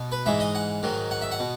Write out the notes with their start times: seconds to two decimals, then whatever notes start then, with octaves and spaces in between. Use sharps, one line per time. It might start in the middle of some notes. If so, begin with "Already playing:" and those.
Already playing: B2
0.12 B4
0.26 G#2 E3 G#3 E5
0.40 D#5
0.55 F#5
0.83 G#2 D#3 F#3
1.11 F#5
1.22 E5
1.31 F#5
1.39 B2